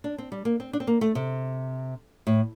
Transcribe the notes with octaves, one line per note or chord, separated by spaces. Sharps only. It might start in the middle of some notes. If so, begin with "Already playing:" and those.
D4
C4
G3
A#3
C4
D4
C4
A#3
A3
C3
A2